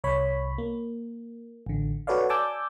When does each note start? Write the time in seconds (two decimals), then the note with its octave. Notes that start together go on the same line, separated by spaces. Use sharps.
0.04 C2 C#5 B5
0.58 A#3
1.66 A1 D3
2.07 F#4 A4 B4 C#5 D5 F5
2.29 D5 G#5 A5 D6 E6 G6